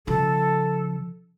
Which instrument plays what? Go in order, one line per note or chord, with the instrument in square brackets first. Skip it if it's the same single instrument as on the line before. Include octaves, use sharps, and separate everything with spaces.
[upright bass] C#3 F3 [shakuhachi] A4